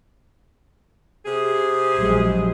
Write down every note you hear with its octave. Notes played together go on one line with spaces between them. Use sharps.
C3 G#4
A#1 F#3 G#3